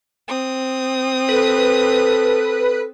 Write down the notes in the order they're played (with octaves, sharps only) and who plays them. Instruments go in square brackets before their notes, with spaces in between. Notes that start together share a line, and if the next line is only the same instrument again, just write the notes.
[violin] C4 D#6
[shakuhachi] A4 [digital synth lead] B4